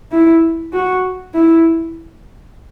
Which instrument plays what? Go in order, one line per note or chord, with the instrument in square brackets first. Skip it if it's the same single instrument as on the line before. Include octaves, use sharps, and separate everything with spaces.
[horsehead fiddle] E4
F#4
E4